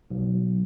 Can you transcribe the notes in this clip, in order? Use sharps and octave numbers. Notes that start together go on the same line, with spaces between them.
B1